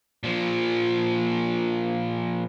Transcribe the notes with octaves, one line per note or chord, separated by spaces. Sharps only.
A#2 F3